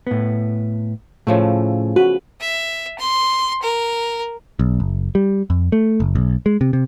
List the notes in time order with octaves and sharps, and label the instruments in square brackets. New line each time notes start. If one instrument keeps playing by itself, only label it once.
[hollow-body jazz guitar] A2 B3
[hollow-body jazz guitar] A2 [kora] C#3 F3 A3
[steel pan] F#4 [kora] B4
[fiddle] E5
C6
A#4
[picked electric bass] B1
F#1
G3
F2
A3
F#1
B1
G#3
C3
C3